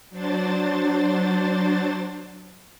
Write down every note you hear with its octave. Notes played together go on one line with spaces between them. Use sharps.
F#3 D4 C5 A6